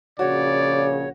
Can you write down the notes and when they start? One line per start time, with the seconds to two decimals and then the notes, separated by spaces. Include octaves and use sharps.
0.19 A#1 C#3 F#4 C#5 D5